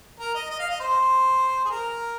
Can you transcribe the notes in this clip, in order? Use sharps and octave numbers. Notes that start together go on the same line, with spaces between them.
A#4
D#5
D#5
F5
D#5
C5
G#4
A#4